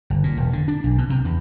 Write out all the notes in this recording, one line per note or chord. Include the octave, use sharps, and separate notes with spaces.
G1
A#2
E1
D3
D4
B1
B2
C3
E2